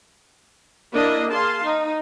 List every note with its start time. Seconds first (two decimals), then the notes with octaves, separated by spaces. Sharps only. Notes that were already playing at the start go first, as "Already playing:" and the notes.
0.93 A#3 D4 E4 D#5 E5
1.30 G#4 F5 A5 C6
1.64 D#4